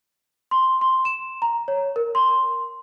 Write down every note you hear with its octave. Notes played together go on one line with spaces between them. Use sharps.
C6
C6
E7
A#5
C#5
A#4
C6